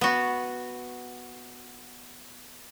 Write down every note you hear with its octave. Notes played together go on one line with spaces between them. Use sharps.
B3 F#4